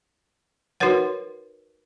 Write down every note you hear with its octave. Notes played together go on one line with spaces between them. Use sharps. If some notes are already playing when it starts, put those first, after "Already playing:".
D#4 F#4 A#4 B4 C#5 F#5